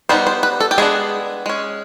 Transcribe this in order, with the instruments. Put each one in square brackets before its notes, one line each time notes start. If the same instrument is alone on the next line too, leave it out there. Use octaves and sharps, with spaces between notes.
[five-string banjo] G3 B3 D#4 C5
C5
B4
A4
G4
G#3 B3 D4 G#4
G#3 C#4